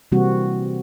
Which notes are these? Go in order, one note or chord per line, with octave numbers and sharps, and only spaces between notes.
C3 E3 G3 A#3 C4 F#4